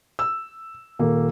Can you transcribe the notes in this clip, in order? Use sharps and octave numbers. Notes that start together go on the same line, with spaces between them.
E6
D#1 A#3